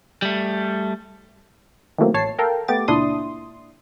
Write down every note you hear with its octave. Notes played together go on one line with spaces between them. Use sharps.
G3 A3
D#3 E3 F#3 A3 A#3 C4
A1 C#5 A5 C7
A4 A#4 F5 G5
A3 B3 G4 D6 A6
C#2 A#2 D4 E4 C6 D#6